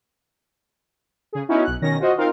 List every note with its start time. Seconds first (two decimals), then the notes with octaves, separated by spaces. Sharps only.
1.33 C#3 G#4
1.48 B3 C#4 D#4 E4 F#4
1.64 B1 F#6
1.81 B2 D#3 C#4 A#6
2.00 F4 F#4 C5 D#5
2.17 C4 D#4 F4 A#4 F5